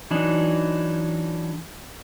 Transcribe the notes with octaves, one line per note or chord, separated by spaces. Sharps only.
E3 F#3 D4 D#4